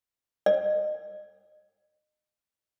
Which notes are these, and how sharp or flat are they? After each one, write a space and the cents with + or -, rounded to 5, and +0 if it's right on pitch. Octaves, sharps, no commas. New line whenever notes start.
D#5 -35